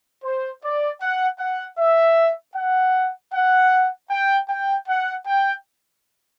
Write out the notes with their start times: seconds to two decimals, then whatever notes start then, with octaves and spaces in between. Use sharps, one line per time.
0.24 C5
0.63 D5
1.01 F#5
1.39 F#5
1.79 E5
2.55 F#5
3.33 F#5
4.11 G5
4.49 G5
4.88 F#5
5.27 G5